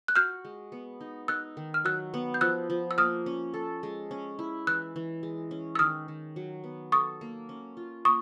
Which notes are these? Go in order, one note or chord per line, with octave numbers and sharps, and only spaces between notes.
F#6
F#4 F6 G6
G#3
B3
D#4
D#4 E6 F#6
D#3
F6
F#3 E6 F#6
B3
G6
F3 E6 F#6
F3
E6
A#3 D#6 F6
C#4
A4
G#3
C#4
E4
E3 E6 F#6
E3
G#3
C#4
E6
D#3 D#6 F6
D#3
F#3
B3
A4 C#6 D#6
A#3
C#4
F4
A#3 C#6 D#6